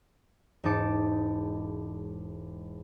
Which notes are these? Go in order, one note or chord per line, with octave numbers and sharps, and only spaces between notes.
E1 G#2 D#4 A5 D6 C#7